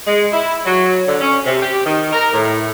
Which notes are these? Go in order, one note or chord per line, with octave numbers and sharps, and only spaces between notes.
G#3
E4
F#3
D3
C#4
C3
G4
D#3
A#4
A2